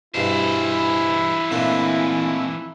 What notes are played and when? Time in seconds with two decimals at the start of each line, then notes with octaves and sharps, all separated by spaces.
0.14 G2 B2 E3 E4 C5
1.51 A#2 A3 C4 D4 D#4